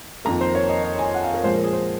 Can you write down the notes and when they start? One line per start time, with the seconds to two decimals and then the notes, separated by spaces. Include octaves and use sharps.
0.25 F2 D#3 A#3 A#5
0.41 C5
0.55 C#5
0.69 D#5
0.85 D#5
0.99 G#5
1.14 F#5
1.24 F5
1.34 A#4
1.44 A#2 F3 G#3 C5
1.54 A#4
1.64 G#4
1.73 C5